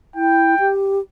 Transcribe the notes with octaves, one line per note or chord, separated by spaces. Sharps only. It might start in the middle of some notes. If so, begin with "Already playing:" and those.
E4 G5
G4